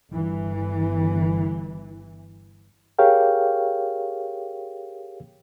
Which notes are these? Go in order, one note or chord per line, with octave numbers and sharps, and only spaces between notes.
G1 E3
G4 G#4 A#4 C#5 F5 G5